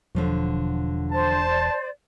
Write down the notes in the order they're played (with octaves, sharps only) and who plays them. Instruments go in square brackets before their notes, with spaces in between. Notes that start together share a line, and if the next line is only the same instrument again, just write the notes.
[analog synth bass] E1 [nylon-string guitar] D3 F3 F#3
[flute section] C5 D5 [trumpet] A5